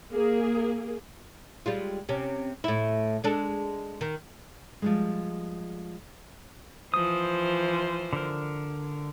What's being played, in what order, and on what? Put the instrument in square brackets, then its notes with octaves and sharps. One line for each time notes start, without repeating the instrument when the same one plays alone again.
[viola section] A#3 G#4
[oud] G3 G#3 F4
C3 C#4
A2 E4
G#3 D4 A4
D#3
[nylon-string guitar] F3 G3 G#3
[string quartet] E3 F3 C5 [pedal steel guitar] D#6
[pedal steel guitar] D3 A#4